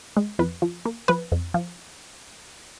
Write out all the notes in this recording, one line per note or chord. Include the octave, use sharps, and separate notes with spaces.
G#3
F2 B4
F3
A#3
F3 B4
F2
F3